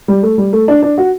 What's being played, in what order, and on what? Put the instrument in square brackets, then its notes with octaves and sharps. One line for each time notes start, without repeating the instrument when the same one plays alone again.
[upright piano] G3
A3
G3
A3
D4
D4
F#4